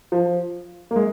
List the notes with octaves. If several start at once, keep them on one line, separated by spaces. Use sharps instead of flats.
F3
A#3
G#3